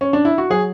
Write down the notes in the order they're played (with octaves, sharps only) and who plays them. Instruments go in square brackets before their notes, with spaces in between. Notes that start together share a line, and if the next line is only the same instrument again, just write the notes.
[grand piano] C#4
D4
E4
F#4
F#3 G#4